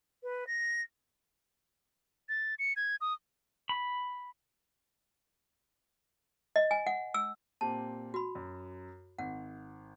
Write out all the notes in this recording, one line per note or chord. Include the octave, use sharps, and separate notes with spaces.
B4
A#6
A6
C#7
G#6
D#6
B5
D#5
G#5
F#5
E6
A#2 C4 G4 A5
F#4 B5
F#2
G#1 F#5